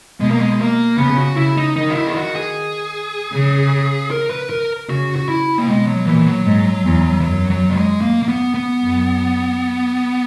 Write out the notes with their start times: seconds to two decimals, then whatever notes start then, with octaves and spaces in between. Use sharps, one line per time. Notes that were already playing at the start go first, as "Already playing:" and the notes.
0.20 B2 G#3
0.30 A#3
0.39 G#3
0.60 A#3
0.98 C#3 B3
1.17 F#4
1.37 C#3 E4
1.57 D#4
1.76 D#3 D#4
1.90 F#4
1.96 E4
2.07 G#4
2.15 F#4
2.36 G#4
3.33 C#3
4.11 A#4
4.30 B4
4.50 A#4
4.89 C#3 F#4
5.16 F#4
5.29 E4
5.58 A#3
5.67 B2 G#3
5.87 F#3
6.06 A#2 E3
6.26 F#3
6.46 G#2
6.85 E2
7.20 E3
7.24 F#2 F#3
7.50 F#3
7.70 A#3
7.75 G#3
8.01 A#3
8.23 A#3
8.28 B3
8.54 B3
8.81 F#2